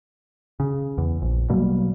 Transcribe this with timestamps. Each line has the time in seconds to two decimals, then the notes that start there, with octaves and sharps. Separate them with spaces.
0.60 C#3
0.98 E2
1.22 A#1
1.50 B2 F#3 G3 A#3